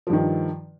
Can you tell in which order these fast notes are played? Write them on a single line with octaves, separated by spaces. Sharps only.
F3 G2 D#3